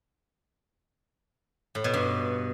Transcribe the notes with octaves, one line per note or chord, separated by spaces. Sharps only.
A2
B2
G2